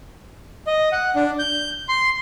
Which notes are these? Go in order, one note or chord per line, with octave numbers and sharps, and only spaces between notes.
D#5
F#5
D4
G6
C6